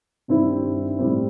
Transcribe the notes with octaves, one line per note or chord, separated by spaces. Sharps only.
G2 D#3 G3 C4 E4
A2 G3 C4